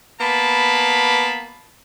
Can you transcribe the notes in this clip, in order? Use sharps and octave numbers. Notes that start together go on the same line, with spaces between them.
A#3 B3 A5 B5